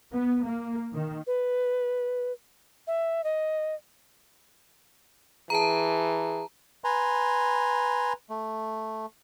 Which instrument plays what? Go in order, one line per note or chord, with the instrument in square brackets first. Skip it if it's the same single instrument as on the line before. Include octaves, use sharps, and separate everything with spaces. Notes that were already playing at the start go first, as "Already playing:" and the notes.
[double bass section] B3
A#3
D#3
[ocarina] B4
E5
D#5
[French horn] E3 [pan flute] G#4 [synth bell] A5 A#5
[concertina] B4 G#5 A#5 C6
A3